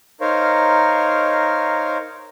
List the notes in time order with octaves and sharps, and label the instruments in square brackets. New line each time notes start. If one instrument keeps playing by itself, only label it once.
[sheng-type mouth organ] D#4 A#4 C5 C#5 F5